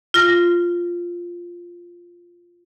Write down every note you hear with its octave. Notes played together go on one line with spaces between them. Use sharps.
F4 A#6